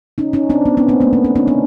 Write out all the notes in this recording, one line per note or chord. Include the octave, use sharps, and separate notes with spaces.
C#4 D#4
C#4 D#4
C4 D4
B3 C#4
B3 C#4
A#3 C4
A3 B3
A#3 C4
C4 D4
C#4 D#4
C4 D4